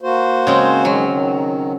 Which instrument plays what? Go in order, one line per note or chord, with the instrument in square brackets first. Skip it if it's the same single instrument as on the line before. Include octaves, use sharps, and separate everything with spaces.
[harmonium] A#3 F#4 C5
[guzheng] C#3 G#3 C4
[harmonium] D#3 G#3 [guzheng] F#3
[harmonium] D#3